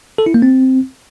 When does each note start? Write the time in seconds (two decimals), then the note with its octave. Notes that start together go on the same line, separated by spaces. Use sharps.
0.18 A4
0.26 E4
0.34 A#3
0.42 C4